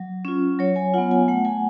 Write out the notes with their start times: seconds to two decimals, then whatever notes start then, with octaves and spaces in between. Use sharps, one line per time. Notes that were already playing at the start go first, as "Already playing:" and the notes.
Already playing: F#3
0.25 C#4 F4
0.59 F#3 C#5
0.76 G#5
0.94 F4 F#5
0.98 B3
1.11 G#5
1.28 A3 F#5
1.45 G#5